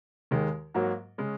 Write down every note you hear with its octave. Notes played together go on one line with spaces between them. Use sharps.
D#2 D#3 G#3
G#2 F#3 A#3 F#4
C#3 G#3 C#4